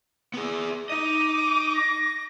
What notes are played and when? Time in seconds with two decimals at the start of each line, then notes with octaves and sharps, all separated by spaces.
0.34 B3 G#4
0.90 D#4 D#5 D6 D#7
1.75 A#6